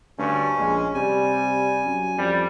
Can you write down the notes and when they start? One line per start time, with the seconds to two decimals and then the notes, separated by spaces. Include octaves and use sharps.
0.19 D2 G2 C#4
0.58 A#1 G#3
0.95 C3 G3 G#5
1.84 F#2
2.18 F2 G3